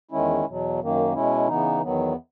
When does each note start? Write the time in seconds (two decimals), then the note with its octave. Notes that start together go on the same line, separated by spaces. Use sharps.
0.11 E2 D#3 G#3 C#4 E4
0.46 E2 B2 F#3
0.79 F#2 D#3 A#3
1.13 B2 G#3 C#4 E4
1.48 C#3 E3 B3 D#4
1.82 E2 D#3 F#3 B3